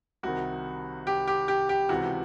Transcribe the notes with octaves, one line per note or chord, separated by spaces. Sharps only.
C2 C3 D#3 F#4
G4
G4
G4
G4
C#2 C3 E3 F#4